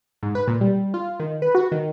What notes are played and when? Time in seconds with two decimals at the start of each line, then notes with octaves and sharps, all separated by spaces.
0.23 G#2
0.35 B4
0.48 A#2
0.61 G3
0.94 F4
1.20 D#3
1.42 B4
1.55 F#4
1.72 D#3